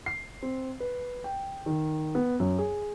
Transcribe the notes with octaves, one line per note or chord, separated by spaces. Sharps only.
C7
C4
B4
G5
D#3
B3
F#2
G#4